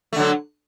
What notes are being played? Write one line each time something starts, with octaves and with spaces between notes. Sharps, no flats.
D3 F#3 A3